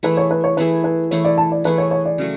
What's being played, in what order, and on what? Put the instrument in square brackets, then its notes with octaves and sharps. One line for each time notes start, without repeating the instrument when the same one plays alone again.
[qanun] E3 A3 E4 G#4 [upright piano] B4
[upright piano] C#5
B4
C#5
[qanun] E3 A3 E4 G#4 [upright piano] B4
[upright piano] B4
[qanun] E3 A3 E4 G#4 [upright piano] C#5
[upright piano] D5
A5
D5
[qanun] E3 A3 E4 G#4 [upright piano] B4
[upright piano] C#5
C#5
D5
[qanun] C#3 F#3 A3